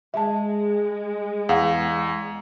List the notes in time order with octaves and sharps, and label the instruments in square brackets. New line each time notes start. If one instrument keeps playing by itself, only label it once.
[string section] G#3 [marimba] E5 A5
[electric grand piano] E2 [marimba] F5 F#5